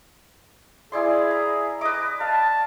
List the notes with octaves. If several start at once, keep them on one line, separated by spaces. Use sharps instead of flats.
E4 G#4 D5 C6
A#5
B4 D#5 D6
F5 A5